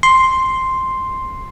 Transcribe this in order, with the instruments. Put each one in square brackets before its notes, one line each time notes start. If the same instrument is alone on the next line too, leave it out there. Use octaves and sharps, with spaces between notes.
[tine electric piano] C6